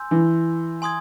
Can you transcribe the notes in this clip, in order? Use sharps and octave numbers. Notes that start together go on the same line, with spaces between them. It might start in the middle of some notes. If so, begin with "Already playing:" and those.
Already playing: G#5 C6 E6 G6
E3
G#5 C6 D#6 G#6